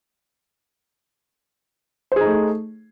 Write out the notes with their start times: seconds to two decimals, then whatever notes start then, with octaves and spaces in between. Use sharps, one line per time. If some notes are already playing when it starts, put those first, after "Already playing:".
2.12 C5
2.16 G#4
2.21 D#4
2.25 A3